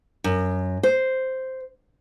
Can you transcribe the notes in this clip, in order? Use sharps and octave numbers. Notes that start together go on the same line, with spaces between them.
F#2
C5